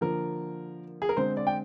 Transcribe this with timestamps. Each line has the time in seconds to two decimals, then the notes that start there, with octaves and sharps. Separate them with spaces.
0.01 D3 F3 A#3 A#4
1.02 G#4
1.09 A#4
1.17 D3 G#3 C4 C5
1.37 D5
1.47 G5